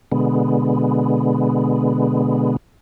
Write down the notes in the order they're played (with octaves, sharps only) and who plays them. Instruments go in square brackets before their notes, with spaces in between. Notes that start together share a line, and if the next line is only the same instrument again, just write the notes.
[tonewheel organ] B2 D3 G#3 B3